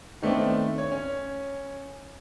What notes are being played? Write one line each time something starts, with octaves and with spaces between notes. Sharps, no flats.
D#3 A3 B3 C4 D4
C#5
C#4